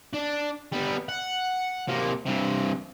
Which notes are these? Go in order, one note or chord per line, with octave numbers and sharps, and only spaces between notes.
D4
G3 B3
F#5
C3 A#3
G2 C3